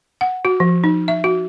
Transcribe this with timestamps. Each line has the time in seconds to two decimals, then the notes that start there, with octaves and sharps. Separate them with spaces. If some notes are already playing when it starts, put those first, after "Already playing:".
0.21 F#5
0.45 F#4
0.60 F3
0.84 D#4
1.08 E5
1.24 F#4